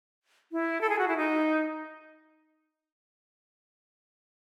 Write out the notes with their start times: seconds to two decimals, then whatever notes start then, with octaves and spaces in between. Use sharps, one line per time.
0.52 E4
0.81 A4
0.89 G#4
0.99 F#4
1.08 E4
1.17 D#4